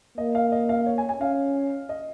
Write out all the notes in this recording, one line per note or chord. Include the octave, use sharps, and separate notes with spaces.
A#3 D#5
F5
D#5
F5
C#5
G#5
G#5
C#4 F5
D#5